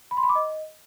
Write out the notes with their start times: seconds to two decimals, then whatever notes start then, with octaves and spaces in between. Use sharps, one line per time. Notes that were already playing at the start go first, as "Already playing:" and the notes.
0.11 B5
0.17 C6
0.23 B5
0.29 D6
0.35 D#5